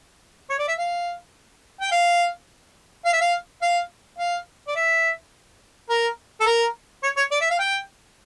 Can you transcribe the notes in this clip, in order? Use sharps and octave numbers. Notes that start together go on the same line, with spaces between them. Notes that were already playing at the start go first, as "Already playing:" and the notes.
C#5
D5
E5
F5
G5
F5
F5
E5
F5
F5
F5
D5
E5
A#4
A4
A#4
C#5
C#5
D5
E5
F5
G5